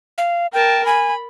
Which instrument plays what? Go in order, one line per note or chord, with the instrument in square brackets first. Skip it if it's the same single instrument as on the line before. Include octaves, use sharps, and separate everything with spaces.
[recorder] F5
[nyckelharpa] A#4 A5 [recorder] G5
[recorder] G#5 [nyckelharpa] B5